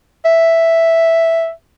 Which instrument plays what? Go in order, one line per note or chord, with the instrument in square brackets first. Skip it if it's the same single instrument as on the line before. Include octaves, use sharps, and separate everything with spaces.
[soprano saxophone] E5